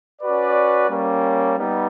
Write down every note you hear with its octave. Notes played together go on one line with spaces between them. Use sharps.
C#4 F#4 B4 D5
G3 A#3 C#4
G3 B3 D#4